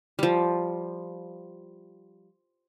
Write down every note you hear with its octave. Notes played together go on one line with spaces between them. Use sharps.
F3 G3